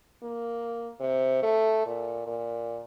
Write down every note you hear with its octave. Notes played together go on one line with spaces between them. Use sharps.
A#3
C3
A3
A#2
A#2